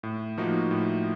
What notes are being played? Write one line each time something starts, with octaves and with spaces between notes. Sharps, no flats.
A2
F3 A#3 D#4 F#4
A2